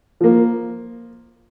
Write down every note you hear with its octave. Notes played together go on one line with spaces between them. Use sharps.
F3 A#3